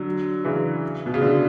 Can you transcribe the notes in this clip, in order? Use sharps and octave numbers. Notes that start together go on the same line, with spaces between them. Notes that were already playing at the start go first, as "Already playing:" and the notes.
Already playing: D3 F#3
C#3 E3
B2
C#3
B2 D3